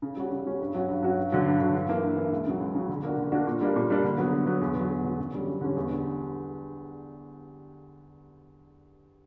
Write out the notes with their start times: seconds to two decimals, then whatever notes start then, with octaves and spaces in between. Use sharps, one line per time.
0.02 C#3
0.17 G3 C#4 F#4
0.32 C#3
0.46 G3 C#4 F#4
0.61 G2
0.74 F#3 C#4 F#4
0.89 G2
1.02 F#3 C#4 F#4
1.17 G2
1.32 D3 F#3
1.46 G2
1.61 D3 F#3
1.74 G2
1.88 E3 A#3
2.03 G2
2.17 E3 A#3
2.32 C#2
2.47 C#3 F#3
2.61 C#2
2.75 C#3 F#3
2.89 D3
3.03 A#3 D4 F#4
3.18 D3
3.32 A#3 D4 F#4
3.47 A#2
3.61 G3 A#3 D4
3.76 A#2
3.90 G3 A#3 D4
4.04 D3
4.18 F#3 B3
4.32 D3
4.46 F#3 B3
4.61 E2
4.75 D3 F#3
4.90 E2
5.04 D3 F#3
5.19 F#2
5.33 D3 G3 C#4
5.47 F#2
5.61 D3 G3 C#4
5.76 E2
5.90 D3 G3